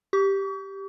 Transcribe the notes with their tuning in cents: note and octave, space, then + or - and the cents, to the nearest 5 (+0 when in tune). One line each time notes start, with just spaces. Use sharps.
G4 +0 C#6 +45